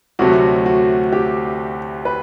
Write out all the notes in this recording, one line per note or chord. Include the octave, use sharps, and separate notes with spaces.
D2 C3 F#3 A3 F#4
F#4
G4
B4